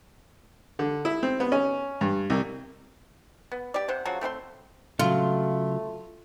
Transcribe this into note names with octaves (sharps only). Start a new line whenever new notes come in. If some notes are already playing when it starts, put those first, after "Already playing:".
D3
E4
C4
B3
C#4
G2
C2
B3
G4 D5
C3 C5 F#5
C#3 F3 F#3 F#4
A3 C4 B4 C6
C#3 F#3 A3 F4